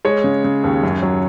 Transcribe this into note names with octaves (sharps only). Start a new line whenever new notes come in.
G#3 C#5
C#3
C#3
D#2
F#2
F#3